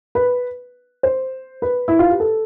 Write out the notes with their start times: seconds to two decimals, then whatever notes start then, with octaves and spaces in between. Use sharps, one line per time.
0.15 B4
1.03 C5
1.62 B4
1.88 E4
1.99 F4
2.09 G4
2.20 A4